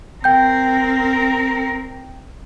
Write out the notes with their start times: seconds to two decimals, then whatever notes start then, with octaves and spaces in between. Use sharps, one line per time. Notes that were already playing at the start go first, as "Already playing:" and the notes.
0.24 C4 A#4 G5 G6